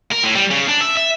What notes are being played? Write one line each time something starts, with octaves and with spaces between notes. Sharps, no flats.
A#4
A2
G3
C#3
D4
E5
E5